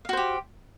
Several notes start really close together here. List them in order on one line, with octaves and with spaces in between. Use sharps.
F5 F#4 C5 G4